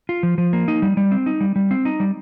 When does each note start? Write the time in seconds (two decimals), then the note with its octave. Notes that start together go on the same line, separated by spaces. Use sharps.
0.09 F4
0.23 F3
0.38 F3
0.53 A#3
0.68 D#4
0.82 G3
0.97 G3
1.12 C4
1.26 D#4
1.41 G3
1.56 G3
1.71 C4
1.85 D#4
2.00 G3